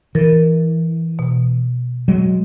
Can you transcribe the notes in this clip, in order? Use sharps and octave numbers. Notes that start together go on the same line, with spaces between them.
E3 A#4 A6
B2
F#3 G#3